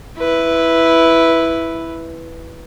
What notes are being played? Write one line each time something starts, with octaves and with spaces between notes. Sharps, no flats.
E4 B4